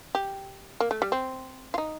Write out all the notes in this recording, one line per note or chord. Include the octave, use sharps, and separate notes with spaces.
G4
A#3
A3
G3
C4
F4
D#4